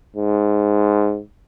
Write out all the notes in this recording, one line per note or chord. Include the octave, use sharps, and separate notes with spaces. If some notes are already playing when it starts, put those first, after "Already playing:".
G#2